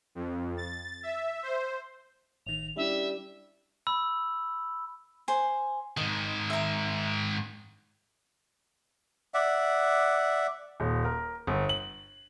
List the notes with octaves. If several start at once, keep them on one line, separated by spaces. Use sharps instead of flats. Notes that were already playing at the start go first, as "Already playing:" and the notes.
F2
A6
E5
C5
A1 D#3 F7
G3 C#4 D4 E4 E5
B5 E6
C5 G#5
G#2 D#3 D#5
E5 A#5
D5 E5 F#5
D#1
A#4
G1
F#7